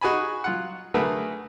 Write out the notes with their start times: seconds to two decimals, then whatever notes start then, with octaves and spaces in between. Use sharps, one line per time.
0.01 D#4 F#4 G#4 G#5 B5
0.44 F#3 F4 F#5
0.94 D3 F#3 A3 G#4 A#4 B4